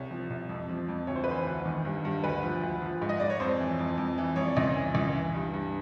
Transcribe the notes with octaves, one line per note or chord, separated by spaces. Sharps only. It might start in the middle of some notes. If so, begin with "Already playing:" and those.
Already playing: C2 C#5
F3
C2
F2
F3
F2
D2 C#5
C5
B4
E3 C5
D2
D#3
G2
G2
D2 B4
F3
D2
F3
G#2
D#5
G#2 D5
C#5
F2 C5
E3
F2
F2
E3
F2 C#5
D5
C#2 D#5
E3
C#2
E3
G2
G2